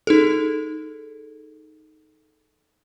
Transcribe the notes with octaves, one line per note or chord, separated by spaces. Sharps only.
D#4 G#4 A4